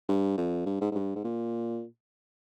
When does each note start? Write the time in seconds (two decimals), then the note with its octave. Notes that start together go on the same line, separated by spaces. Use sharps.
0.09 G2
0.38 F2
0.66 G2
0.81 G#2
0.92 G#2
0.95 G2
1.16 G#2
1.24 A#2